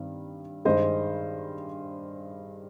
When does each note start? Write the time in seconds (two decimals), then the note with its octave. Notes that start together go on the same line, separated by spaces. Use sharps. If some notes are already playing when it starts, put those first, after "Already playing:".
Already playing: G2 D#3 C4
0.65 G2 D#3 G#3 C5 D#5